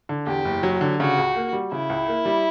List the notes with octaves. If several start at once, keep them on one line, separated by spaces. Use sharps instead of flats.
D3
E2 G4
F#1
F#3
D3
C#3 F#4
C#2
A#3
G3
C#3 E4
C#2
A#3
G3